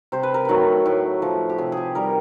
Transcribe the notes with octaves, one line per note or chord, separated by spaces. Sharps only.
C3 C5
B4
A#4
D#3 F#3 A3 B4
A2
F3 A3
G4
C3 G#4
G4 G#4
D#3 G3 A#4